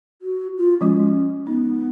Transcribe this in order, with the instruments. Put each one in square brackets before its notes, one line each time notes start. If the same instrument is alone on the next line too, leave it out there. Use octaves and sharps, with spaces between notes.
[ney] F#4
F4
[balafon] F3 G#3 F#4 [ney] C#4
[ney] B3 [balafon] D#4